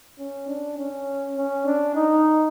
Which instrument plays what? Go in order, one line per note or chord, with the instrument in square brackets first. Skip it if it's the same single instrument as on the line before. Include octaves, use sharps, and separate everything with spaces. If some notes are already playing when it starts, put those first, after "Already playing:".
[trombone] C#4
D4
C#4
C#4
D4
D#4